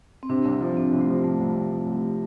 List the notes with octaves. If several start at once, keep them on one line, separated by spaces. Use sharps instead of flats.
C4
C3 D4
C2
F3
C3 C4
C2
A3
F3
C2 A3
C2
C2
F3
C2